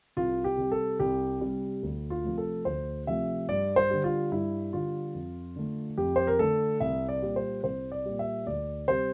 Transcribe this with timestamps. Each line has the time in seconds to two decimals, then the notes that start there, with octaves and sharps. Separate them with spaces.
0.17 C2 F4
0.44 G4
0.58 C3 G3
0.72 A4
1.00 C2 G4
1.41 C3 G3
1.83 D2
2.10 F4
2.24 C3 F3 A3
2.38 A4
2.65 D2 C5
3.07 C3 F3 A3 E5
3.49 G2 D5
3.76 C5
3.90 D3 G3
4.04 F4
4.32 G2 E4
4.73 D3 G3 F4
5.14 F2
5.56 D3 A3
5.98 F2 G4
6.16 C5
6.27 A#4
6.39 D3 A3 A4
6.80 C2 E5
7.09 D5
7.23 A#2 G3
7.36 C5
7.64 C2 C5
7.92 D5
8.05 A#2 G3
8.19 E5
8.46 D2 D5
8.88 C3 G3 C5